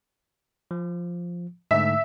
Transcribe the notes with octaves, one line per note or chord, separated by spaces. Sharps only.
F3
G#2 D3 A3 E5